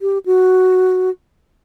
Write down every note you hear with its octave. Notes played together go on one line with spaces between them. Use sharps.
G4
F#4